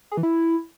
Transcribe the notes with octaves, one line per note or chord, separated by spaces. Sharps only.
G#4
E3
E4